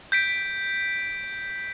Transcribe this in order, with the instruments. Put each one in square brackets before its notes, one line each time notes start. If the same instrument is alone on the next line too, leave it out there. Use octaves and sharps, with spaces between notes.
[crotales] G6 B6 D7